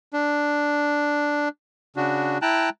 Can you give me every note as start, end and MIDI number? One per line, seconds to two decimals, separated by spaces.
0.14 1.49 62
1.96 2.38 49
1.96 2.38 62
1.96 2.38 66
2.42 2.70 64
2.42 2.70 79
2.42 2.70 81
2.42 2.70 82
2.42 2.70 90